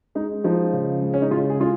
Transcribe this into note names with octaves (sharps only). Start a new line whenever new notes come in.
G#3 D#4
F3 D#4
C#3
G#3
C#4
D#4
C#3 F4
G#4
G#3 F4